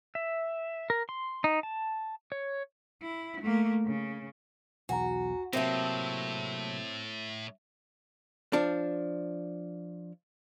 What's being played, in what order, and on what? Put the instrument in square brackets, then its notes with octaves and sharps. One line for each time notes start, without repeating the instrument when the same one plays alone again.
[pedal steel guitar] E5
A#4
C6
D#4
A5
C#5
[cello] E4
A3 A#3
C#3
[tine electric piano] B1 E2 [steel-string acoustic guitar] F#4 [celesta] G#5 A#5
[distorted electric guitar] A2 [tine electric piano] C3 F#3 A#3 [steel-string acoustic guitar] C4 A4 [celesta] E5 A#6
[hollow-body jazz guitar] F3 D4